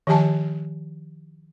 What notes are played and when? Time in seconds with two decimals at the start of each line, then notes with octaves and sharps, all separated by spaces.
0.07 D#3 F3 G4 G#5 A5